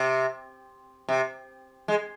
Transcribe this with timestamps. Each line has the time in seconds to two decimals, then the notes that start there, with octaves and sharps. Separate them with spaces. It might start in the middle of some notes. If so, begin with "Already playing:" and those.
Already playing: C3
1.09 C3
1.88 G#3